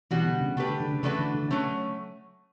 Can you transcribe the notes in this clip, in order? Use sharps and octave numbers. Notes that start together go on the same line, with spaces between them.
B2 E3 G3 B3 F#4
D3
C#3
C#3 A3 D4 G4 B4
D3
D3
C#3
C#3 E3 A3 D4 F#4 B4
D3
D3
C#3 F#3 A3 C#4